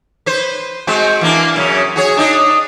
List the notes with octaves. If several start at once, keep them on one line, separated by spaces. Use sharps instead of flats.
B4 C5
G#3 C4 F#4
E3 A#3 D4
F#2 C#3
F#4 G#4 C#5
D4 D#4 D#5